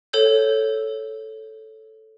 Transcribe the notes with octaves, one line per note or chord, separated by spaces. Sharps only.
A4 C#5 E6 G6